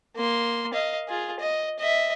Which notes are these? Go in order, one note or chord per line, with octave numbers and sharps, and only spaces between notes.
A#3 C6
D#5 F5
F4 G#4
D#5
D#5 E5